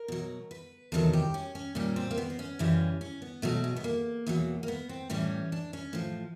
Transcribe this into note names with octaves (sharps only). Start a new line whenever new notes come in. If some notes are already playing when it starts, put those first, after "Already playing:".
Already playing: A#4
B2 F#3
B4
E2 C3 D#3 F#3 A4
G4
C#4
C#4
A#2 G3 C#4
C4
A#3
B3
C4
C#4
F#2 C#3 E3 G3
C#4
B3
B2 F#3 A3
G#3
B3
A#3
E2 B2 F#3
A#3
B3
C4
A2 E3 G3 C#4
D4
C#4
A2 F3